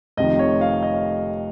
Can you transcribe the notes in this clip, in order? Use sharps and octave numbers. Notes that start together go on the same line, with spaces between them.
F1 F2 C3 D#3 D#5
C#5
F5
D#5